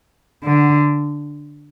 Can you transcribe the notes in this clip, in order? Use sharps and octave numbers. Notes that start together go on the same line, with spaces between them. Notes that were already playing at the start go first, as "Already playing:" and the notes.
D3